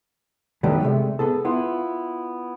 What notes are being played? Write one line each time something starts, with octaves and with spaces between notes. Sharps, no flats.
D3 D#3 F#3 G3 A3 B3
C3 E3 G#3 A3
B3 G#4 A4
B3 E4 F4